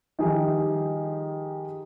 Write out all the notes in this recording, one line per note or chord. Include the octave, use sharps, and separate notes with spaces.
D#3 F3 G3 D#4 G4 G#4